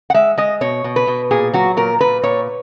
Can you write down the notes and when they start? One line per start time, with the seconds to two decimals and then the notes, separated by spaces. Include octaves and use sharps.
0.10 F#5
0.14 G#3 E5
0.37 G#3 D#5
0.61 B2 C#5
0.84 B2
0.96 B4
1.07 B2
1.31 A#2 G#4
1.53 F#3 F#4
1.77 A#2 A#4
2.00 A#2 B4
2.23 A#2 C#5